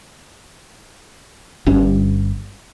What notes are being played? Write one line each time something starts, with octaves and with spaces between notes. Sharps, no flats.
G1 G2 C#4